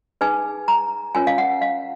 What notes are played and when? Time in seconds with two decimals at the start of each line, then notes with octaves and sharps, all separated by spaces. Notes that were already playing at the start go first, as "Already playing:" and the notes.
0.21 D#4 G#4 B4 G#5
0.68 A#5
1.15 C#4 F4 A#4 C#5 G#5
1.27 F5
1.38 F#5
1.62 F5